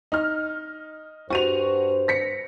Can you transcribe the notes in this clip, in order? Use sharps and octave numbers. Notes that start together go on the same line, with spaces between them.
D#4 F6
G2 F#4 C5 D#7 F7
A#6 B6 C#7